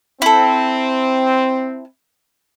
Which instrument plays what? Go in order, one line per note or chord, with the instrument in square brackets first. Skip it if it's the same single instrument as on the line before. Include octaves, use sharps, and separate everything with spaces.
[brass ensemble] C4 [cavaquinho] E4 A4